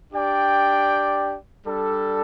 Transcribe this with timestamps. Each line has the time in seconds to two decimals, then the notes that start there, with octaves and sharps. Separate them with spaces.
0.13 D4 G4 D5 G5
1.66 G3 D4 A4